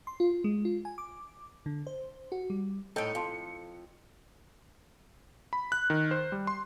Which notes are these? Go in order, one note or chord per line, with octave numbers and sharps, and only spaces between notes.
C6
F4
G#3
F4
G#5
D6
D3
C5
F#4
G3
A2 D#4 A4 G5 C#7
F2 F5 A5 C6
B5
F#6
D#3
C5
G3
C6